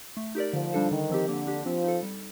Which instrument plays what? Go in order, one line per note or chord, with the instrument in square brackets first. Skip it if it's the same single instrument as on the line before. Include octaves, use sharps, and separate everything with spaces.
[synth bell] A3
D#4 G4 A#4 D5
[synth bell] D3 [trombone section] F3
[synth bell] G3 D4 A4 C5
[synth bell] D3 [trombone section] D#3
[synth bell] F3 C4 G4
[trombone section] D3 [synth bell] A#3
[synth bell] D4 G4
[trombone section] F3 [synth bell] C4
[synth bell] D#4 A4
G3